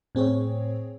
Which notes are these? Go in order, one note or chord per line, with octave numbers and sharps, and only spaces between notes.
A2 C4 G#4 C#5